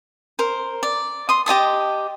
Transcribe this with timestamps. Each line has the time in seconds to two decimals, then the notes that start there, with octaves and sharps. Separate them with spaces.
0.39 A#4 C5
0.83 D5
1.29 C6 D#6
1.46 G4 D#5 A5 D#6